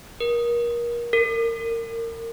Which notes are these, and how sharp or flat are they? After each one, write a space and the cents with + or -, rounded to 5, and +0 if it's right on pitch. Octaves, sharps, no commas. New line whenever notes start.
A#4 +30
A#4 -25